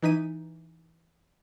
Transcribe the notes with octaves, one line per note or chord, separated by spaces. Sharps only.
E3 D#4 B6 D#7